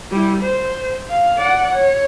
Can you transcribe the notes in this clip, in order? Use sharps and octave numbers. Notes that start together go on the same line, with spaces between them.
G3 E4
C5
F5
D5 F#5
C#5